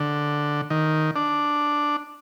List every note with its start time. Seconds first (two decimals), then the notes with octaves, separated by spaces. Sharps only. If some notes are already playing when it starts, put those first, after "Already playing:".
Already playing: D3
0.70 D#3
1.16 D4